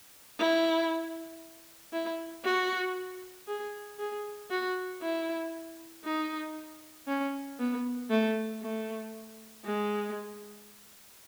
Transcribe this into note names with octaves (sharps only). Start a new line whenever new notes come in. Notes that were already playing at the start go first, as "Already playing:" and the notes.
E4
E4
F#4
G#4
G#4
F#4
E4
D#4
C#4
B3
A3
A3
G#3